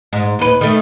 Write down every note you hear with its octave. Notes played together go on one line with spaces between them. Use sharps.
G#2
D#2 B4
D#3 A3